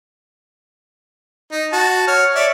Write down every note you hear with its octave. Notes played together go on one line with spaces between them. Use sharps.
D#4
F#4 A5
C#5 F6
C#5 D5 E5